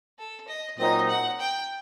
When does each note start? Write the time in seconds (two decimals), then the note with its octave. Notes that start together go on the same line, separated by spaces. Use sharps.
0.18 A4
0.48 D#5
0.78 A#2 F#3 C4 D#4 D#5
1.09 F#5
1.40 G5